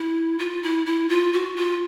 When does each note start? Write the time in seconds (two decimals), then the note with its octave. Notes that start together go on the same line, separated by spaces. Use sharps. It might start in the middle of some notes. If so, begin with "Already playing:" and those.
Already playing: E4
0.39 F4
0.63 E4
0.86 E4
1.09 F4
1.33 F#4
1.56 F4